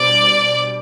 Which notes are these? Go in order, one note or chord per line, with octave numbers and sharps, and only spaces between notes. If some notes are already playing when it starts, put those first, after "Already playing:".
Already playing: B2 G3 D4 C5 D5